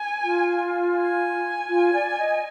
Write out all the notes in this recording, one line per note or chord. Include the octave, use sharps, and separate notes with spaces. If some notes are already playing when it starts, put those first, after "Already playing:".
Already playing: G#5
F4
G#5
F4
D5
D#5